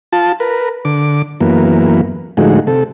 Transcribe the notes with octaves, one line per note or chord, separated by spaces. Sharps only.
F4 A5
A#4 B4
D3 D6
F#2 E3 A#3 B3
A2 D3 F3 G#3 D#4 F#4
C3 A4